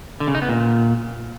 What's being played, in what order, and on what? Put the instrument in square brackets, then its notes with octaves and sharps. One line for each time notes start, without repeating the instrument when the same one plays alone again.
[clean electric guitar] D3
C#3
D#4
B3
A#2